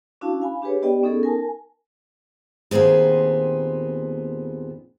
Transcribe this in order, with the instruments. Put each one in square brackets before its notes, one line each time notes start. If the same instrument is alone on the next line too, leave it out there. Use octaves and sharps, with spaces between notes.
[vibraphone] C#4 D4 E4 F#4 F5 A5
F5 G#5 B5
D4 G4 G#4 B4 C#5
B3 G4 D5 D#5 G5
B3 C#4 D#4 G#4 A4
A#4 G#5 A5
[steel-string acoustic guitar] D#2 A#2 B3 C4 G#4